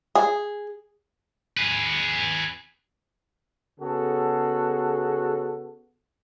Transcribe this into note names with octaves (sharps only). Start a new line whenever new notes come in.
G#4
G#4 B4
C#3 B3 F#4 G#4 A4